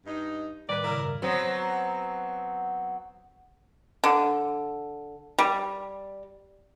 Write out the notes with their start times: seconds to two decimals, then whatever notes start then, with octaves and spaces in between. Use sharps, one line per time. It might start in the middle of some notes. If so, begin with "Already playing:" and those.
0.05 G2 D#4
0.69 A2 D#3 G3 A#3 B4 D5
0.84 C#3 E4 A#4 F5 A#5
0.99 G2
1.22 F#3 B3 C4
4.04 D3
5.39 G3